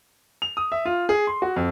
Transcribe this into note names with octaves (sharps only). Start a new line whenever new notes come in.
F7
D#6
E5
F4
G#4
C6
F#4
F2